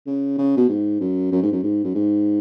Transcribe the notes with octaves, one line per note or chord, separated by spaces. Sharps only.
C#3
C#3
B2
G#2
F#2
F#2
G#2
F#2
G#2
F#2
G#2